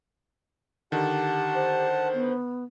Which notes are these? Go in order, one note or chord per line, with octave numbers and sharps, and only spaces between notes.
D3 D#3 G4 F#5 A5
C5
B3